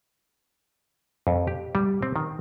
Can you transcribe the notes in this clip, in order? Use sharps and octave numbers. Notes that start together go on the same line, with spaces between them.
F2
G4
G3
C4
D#3